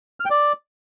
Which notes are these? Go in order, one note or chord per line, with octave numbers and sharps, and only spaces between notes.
F6
G5
D5